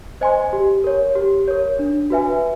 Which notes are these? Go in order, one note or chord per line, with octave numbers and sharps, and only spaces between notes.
C5 D#5 G#5 C6
G4
A#4 C#5
G4
A#4 C#5
D4
F#4 B4 E5 G#5